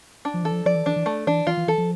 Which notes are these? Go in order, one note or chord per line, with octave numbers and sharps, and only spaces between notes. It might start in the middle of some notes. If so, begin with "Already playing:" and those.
D4
F3
E3 A4
F3
F3 D5
E3
E3 D4
E3
A3
E3 D4
E3 F4
E3
E3 A4
F3